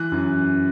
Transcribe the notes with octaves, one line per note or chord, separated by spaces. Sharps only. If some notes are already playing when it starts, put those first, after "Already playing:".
Already playing: E3 F#6
F#2